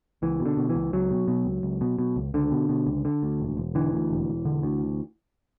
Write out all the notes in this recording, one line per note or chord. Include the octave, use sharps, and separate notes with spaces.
C#2 E3
B2
D3
B2
E3
C#2
C#2 F#3
B2
B2
C#2
C#2
B2
B2
C#2
C#2 D3
B2
B2
C#2
D3
D2
E1
E1
D3 E3
D2
E1
E1
D3
D2